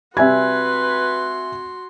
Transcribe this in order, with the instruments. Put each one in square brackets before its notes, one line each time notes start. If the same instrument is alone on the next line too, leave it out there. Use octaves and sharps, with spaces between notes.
[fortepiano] C3 G3 [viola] F#4 C6 [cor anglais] B4 [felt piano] E5 G#5 G#6